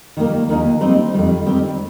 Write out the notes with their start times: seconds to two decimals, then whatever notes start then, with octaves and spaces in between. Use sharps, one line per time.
0.17 D#3 G3 A#3
0.49 D#2 D#3 A#3 D#4 A#4
0.81 G3 C4 D#4 C5
1.14 F2 D#3 G3
1.46 D#3 G3 C4